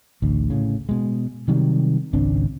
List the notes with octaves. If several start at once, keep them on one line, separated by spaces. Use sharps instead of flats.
A1 D2
A2 C#3
B2 G#3
C3 D#3 F#3 G3
G#1 C#2 C4 D4